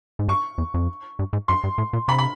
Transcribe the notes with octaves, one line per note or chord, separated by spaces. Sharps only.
G#2
G2 C#6
E2
F2
G2
G#2
F#2 C6
G2
A2
A#2
C3 B5
B5